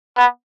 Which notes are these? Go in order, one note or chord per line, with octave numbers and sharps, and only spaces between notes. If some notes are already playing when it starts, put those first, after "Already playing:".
B3